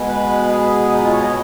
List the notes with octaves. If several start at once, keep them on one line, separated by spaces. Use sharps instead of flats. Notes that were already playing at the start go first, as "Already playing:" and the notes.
Already playing: B2 G#3
B4
G#4
D#4
F4
C#5
D#5